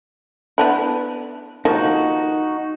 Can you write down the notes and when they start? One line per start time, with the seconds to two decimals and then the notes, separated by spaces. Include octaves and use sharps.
0.58 B3 D4 E4
1.65 D#3 F3 A#3 D#4 F#4